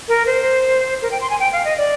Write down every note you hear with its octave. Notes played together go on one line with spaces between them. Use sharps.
A#4
C5
A#4
G5
C6
G#5
G5
F5
D#5
D5